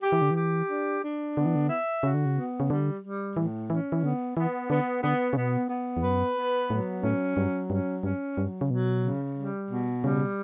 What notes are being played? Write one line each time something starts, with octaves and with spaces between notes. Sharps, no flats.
G4
E3
D3
E3
G4
D4
D4
D3 B3
E3
D3
E5
C#3 F#4
D3
C#3
B3
C#3
D3 G3
G3
A2 E3
E3 C#4
E3
D3 B3
E3 B3
D3 B3
D3 B3
C#3
B2 B3
B3
E2
F#2 B4
B3
A2 F#3
A2 C#4
G2 F#3
G2 C#4
G2 C#4
G2 F#3
C#3
B2 F#3
C#3
G3
B2
C#3 G3